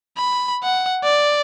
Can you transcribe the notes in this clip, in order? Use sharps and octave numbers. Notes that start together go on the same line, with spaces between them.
B5
F#5
D5